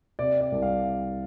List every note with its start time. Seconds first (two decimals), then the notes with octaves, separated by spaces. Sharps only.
0.19 C3 D5
0.41 D5
0.52 C2
0.62 F5